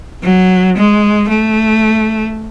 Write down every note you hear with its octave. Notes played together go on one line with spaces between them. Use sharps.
F#3
G#3
A3